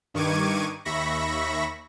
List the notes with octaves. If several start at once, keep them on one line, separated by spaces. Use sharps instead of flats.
G2 D#3 C#6 D6 G#6 D#7
D#2 E5 B5 C#6 A#6